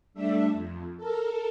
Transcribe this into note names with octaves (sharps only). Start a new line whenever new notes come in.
G3 A3 D4 E5
F2
A4 A#4